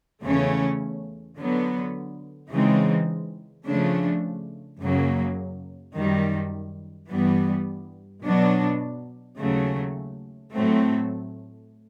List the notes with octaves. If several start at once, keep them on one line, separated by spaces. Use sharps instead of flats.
E2 C#3 E3 A3 C#4
D3 F#3 B3
C#3 E3 G#3 C4 D#4
C#3 F3 A3 D4
F#2 C#3 F#3 A#3
F#2 D#3 G3
G2 E3 G3 B3
B2 F#3 B3 D4
D#2 C#3 F#3 A3
A2 F#3 A3 C4